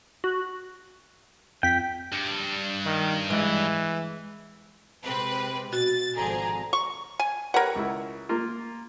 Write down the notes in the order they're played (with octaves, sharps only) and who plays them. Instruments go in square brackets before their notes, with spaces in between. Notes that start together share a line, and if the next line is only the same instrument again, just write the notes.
[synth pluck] F#4
[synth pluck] F2 B6 [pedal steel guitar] G5
[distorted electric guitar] G2
[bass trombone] D#3
[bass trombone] E3 [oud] G#3
[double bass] C3 G#3 [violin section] C4 B4
[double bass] B2 [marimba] F#4 [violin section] A6
[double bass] G#1 F3 [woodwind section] D3 G#5 A#5 [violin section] C4 G#4
[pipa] C#6
G#5
[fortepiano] G4 B4 C#5 [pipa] A#4 F#5
[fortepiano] C#2 E4
A#3 F4